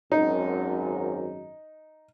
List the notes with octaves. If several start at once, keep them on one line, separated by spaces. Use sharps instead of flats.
G#1 F#2 D#4